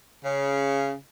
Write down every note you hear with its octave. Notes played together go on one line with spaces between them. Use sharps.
C#3